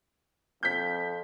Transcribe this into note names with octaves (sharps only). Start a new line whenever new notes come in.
F2 G6 B6